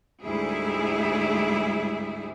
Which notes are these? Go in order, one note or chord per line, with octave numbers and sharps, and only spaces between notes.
D2 G#2 G3 E4 G#4